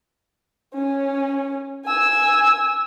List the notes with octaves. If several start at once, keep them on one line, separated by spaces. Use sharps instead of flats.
C#4
G#5 E6